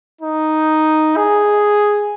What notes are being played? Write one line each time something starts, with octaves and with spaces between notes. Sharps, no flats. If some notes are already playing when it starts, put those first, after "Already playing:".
D#4
G#4